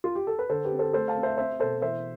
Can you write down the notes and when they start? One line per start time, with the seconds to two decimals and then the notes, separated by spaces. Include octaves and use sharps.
0.04 F4
0.15 G4
0.27 A4
0.39 B4
0.49 D3 A4 C5
0.65 G4 B4
0.72 C4
0.79 A4 C5
0.93 A3 A4 C5
1.08 F5 A5
1.16 C4
1.23 C5 E5
1.38 C4 C5 E5
1.60 B2 A4 C5
1.82 E3 C5 E5